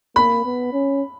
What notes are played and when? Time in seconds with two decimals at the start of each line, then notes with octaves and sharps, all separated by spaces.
0.16 A#3 B5
0.45 B3
0.73 C#4